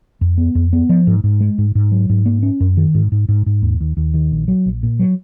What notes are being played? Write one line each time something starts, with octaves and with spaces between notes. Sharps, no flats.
F2
B3
F2
B3
F3
G#2
G#2
G#3
G#2
G#2
F#3
G#2
A#3
C#4
F#2
D#3
G#2
G#2
G#2
G#2
D#2
D#2
D#2
D#3
A#1
F#3
A#1
A#2
F#3